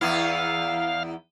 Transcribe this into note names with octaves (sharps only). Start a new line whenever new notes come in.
E2 B3 E4 F5